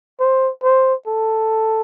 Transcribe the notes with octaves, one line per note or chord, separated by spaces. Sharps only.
C5
C5
A4